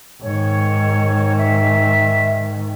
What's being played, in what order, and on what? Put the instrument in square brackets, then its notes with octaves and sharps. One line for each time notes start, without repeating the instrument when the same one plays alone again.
[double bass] G#2 D#3 [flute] C#5
[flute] E5